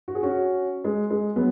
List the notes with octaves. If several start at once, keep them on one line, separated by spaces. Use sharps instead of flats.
F#4
G#4
C#4 F#4
G#3
G#3
F#3 B3